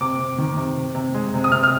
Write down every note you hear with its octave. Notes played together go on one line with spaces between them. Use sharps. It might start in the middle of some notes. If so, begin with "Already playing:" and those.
C3 D6
C3
D#3
C3
C3
C3
G#3
C3
D#6
C3 F6
F6